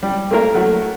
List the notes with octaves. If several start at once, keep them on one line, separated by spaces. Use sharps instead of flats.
G3
A3 A#3 A#4
F#3 A3